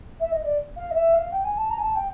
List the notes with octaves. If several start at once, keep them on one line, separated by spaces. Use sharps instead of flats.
E5
D#5
D5
F5
D#5
E5
F5
G5
G#5
A5
A#5
G#5
A5
G5